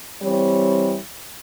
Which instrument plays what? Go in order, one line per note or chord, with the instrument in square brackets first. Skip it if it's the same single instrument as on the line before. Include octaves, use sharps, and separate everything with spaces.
[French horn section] E3 G3 C4 C#5